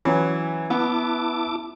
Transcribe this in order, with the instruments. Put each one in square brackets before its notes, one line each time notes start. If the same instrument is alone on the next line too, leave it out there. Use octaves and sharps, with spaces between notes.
[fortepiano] E3 F#3 [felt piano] C#4 C#5 B5
[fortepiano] B3 [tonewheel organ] E4 A5 D6